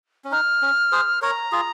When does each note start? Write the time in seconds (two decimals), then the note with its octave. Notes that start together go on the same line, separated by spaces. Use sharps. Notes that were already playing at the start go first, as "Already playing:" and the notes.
0.24 C#4
0.32 D#4 F6
0.62 C#4
0.92 G#4 C5
1.22 A#4 C#5 A#5
1.52 F4 G#4